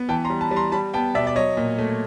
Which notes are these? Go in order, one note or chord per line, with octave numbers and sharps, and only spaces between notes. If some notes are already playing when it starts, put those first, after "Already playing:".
Already playing: B3
E3 G5 A5
A#5 C6
G3
A5 B5
G3
A#5 C6
G3 A5 B5
B3 G5 A5
B2 D5 E5
D5
F#3 C#5 D#5
A#2
A3